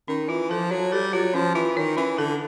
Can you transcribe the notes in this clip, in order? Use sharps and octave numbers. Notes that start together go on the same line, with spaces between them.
D#3 C#4
E3 F4
F3 A4
F#3 C#5
G3 A4
F#3 F4
F3 C#4
E3 F4
D#3 C#5
E3 C#4
D3 A4